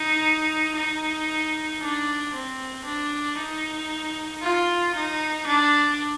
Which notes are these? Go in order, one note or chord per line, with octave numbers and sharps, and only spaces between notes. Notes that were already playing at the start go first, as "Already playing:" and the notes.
Already playing: D#4
D#4
D4
C4
D4
D#4
F4
D#4
D4